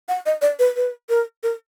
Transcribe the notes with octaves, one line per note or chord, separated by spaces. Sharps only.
F#5
D#5
D5
B4
B4
A#4
A#4